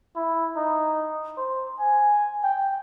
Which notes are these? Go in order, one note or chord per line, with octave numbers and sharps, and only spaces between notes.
E4
D#4
C5
G#5
G5